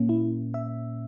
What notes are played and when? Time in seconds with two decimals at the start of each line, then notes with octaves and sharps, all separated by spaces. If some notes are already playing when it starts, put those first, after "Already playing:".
Already playing: A#2 A#3 C#4
0.09 E4
0.54 E5